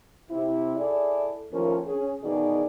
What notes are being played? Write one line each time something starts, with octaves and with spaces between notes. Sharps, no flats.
C3 E4
E4 G#4 A4 D5
D#2 A2 F3 C#4 A#4
C#4 G#4
B2 D#3 E3 D#4 G#4 D5